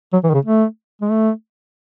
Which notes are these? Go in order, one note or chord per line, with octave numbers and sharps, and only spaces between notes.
F#3
E3
D#3
C#3
A3
G#3
A3